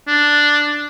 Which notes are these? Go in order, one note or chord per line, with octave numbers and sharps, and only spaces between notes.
D4